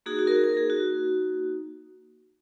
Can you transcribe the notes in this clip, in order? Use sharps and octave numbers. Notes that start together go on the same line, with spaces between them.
A#3 D#4 F#4 G#4
F#4
A#4
G#4
A#4
G#4
F#4